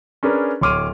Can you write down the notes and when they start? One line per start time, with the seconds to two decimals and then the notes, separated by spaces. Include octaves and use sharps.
0.23 C#4 D4 G#4 A#4 B4
0.61 D1 C#5 C6 D6 F6 D#7